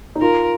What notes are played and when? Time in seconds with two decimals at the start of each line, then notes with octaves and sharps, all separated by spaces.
0.15 D#4
0.21 F4 A#4